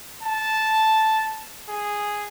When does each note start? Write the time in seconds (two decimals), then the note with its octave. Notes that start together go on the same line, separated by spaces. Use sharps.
0.23 A5
1.69 G#4